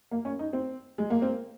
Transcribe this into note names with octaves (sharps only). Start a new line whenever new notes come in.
A#3
C#4
D#4
C4
G#3
A#3
C4